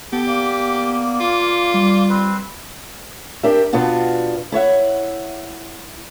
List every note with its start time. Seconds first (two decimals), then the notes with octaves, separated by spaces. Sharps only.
0.12 B3 G4 A4
0.26 A#3 D5
1.20 F4
1.74 G3
2.09 C4 B4 C5
3.43 D4 G4 A#4 E5
3.73 B2 B3 D4 F4 F#4
4.52 E4 C#5 E5 F#5